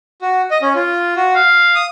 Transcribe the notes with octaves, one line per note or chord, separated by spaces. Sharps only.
F#4
D#5
C#4
F4
F#4
F5
D#6